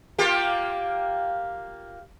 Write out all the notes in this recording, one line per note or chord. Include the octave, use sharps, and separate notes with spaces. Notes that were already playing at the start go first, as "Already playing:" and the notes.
A#3 F4 G4